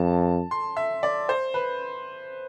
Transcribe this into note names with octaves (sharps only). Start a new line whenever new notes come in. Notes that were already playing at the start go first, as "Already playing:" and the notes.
Already playing: F2 A5
C6
E5
D5
C5
B4